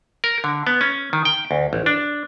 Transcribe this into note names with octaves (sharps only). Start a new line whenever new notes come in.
A#4
D3
B3
C#4
D#3
G5
D2
A1
D4